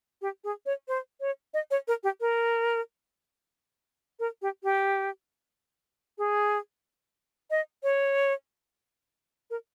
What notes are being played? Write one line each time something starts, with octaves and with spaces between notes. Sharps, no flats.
G4
G#4
C#5
C5
C#5
D#5
C#5
A#4
G4
A#4
A#4
G4
G4
G#4
D#5
C#5
A#4